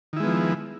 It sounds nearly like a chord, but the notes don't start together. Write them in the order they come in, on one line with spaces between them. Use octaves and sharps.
D#3 E4 G#3 B3 F3